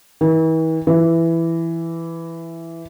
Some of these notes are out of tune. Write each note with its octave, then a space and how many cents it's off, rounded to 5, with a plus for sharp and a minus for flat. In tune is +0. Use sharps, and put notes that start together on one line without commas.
E3 -40
E3 +10